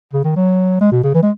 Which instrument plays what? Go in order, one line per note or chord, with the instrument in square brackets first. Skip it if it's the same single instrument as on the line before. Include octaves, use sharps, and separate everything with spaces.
[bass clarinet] C#3
D#3
F#3
G#3
B2
C#3
E3
G#3